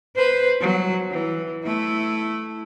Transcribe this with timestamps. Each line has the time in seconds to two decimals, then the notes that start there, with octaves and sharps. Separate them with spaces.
0.16 B4 C5
0.61 F#3
1.11 E3
1.64 A3 E4